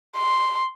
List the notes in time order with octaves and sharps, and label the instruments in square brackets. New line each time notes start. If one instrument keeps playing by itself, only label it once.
[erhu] C6